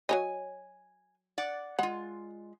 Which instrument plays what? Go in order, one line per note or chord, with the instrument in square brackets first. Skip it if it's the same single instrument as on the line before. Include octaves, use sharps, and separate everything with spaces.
[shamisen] F#3 C#5 D#5 [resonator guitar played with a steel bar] G#5
[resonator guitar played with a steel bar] D5 F#5
[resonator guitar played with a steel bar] G#3 F4 [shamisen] F#5